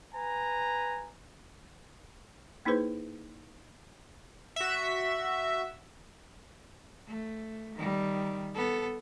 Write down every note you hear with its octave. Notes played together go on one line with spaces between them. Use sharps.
B4 G#5 A#5
A#3 D#4 E4 G#4 B4 C5
F#4 E5
A3
D#3 G3
B3 A4